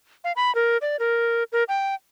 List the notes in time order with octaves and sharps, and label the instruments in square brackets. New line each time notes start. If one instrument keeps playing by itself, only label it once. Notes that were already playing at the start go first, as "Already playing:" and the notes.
[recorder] F5
B5
A#4
D5
A#4
A#4
G5